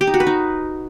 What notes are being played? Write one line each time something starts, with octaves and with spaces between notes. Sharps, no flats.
G4
D#4
F#4
B4
D#4